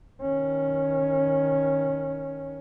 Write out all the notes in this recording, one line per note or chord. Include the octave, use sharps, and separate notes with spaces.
D#3 C#4